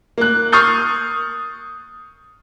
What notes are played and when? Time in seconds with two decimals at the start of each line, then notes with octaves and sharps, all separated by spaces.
0.18 A#3 F#6
0.52 C#6 D#6 F6 G6 A6 C7